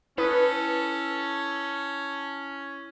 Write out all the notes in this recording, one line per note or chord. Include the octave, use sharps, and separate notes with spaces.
C#4 E4 A4 B4 D#6